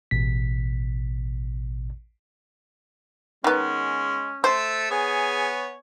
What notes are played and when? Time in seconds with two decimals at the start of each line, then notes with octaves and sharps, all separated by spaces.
0.11 A1 B2 B6
3.44 D#3 G#3 B3 C#4
4.44 A3 A4 C5 E6
4.91 B3 G#4 C#5 G#5